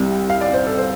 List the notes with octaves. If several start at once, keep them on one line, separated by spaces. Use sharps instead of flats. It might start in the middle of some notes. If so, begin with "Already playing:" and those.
Already playing: C2 C3 G3
F5
D5
C5
A4
C5